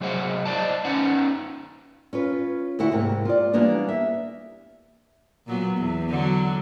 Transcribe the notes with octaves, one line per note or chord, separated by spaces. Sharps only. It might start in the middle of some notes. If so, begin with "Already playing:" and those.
C3 F#3 G#4 C5 D#5 F#5
C5 D5 D#5 A5
C#4 D#4 B4 F#5
C#4 F4 B4
D2 D3 E4 F#4 F#5
G#2 C3 A#3
F4 D5
E3 G3 A#3 B3 D4
E5
A#2 F#3 B3
E2
D3 F#3